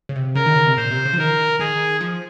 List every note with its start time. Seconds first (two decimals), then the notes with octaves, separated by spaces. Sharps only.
0.09 C#3
0.16 C3
0.35 C#3 A#4
0.46 D#3
0.56 C#3
0.66 C3
0.77 A#2 C5
0.91 C3
1.05 C#3
1.13 F3
1.18 D#3 A#4
1.59 D#3 G#4
2.01 F3